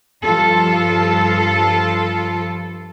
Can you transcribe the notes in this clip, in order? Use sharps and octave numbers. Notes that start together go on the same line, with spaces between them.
G2 F3 F4 A4